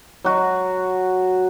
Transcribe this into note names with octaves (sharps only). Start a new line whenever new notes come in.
F#3 F#4